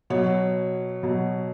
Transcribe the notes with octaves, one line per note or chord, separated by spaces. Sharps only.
B2 F#3 C#5
B2 F#3